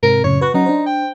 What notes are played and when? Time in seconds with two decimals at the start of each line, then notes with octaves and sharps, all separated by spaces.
0.03 G#2 C3 C4 A#4
0.24 F#2 A2 C#3 C#5
0.41 F#4 B4 F#6
0.54 F#3 C#4 D#4 F#5
0.66 D4 C5
0.86 G5